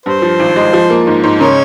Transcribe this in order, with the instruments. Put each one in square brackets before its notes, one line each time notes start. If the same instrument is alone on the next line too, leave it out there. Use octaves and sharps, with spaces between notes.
[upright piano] G2 [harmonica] C5
[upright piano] F3
G#1
G#3
F3
A#3
G#2
G#2
[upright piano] C#3 [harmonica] A#4 C#5